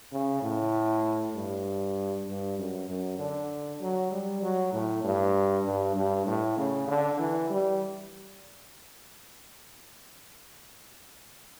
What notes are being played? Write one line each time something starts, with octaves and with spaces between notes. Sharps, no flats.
C#3
A2
G2
G2
F#2
F#2
D3
F#3
G3
F#3
A2
G2
G2
G2
A2
C#3
D3
E3
G3